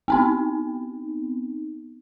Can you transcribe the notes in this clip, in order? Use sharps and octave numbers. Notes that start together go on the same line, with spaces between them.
B3 C4 D#4